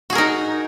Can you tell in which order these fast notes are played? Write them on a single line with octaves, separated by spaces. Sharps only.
F#4 G#4 A#4 D#4